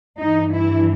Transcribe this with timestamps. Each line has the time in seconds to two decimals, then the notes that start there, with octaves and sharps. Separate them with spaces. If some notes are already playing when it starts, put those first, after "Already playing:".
0.19 G2 E3 D#4
0.53 E4